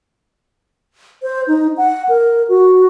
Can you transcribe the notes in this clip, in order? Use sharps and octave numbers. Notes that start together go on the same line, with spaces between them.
C5
D#4
F#5
A#4
F#4